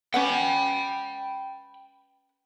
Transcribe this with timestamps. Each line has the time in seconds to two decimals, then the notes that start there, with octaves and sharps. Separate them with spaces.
0.14 C#4 B4 F#5 G5 B5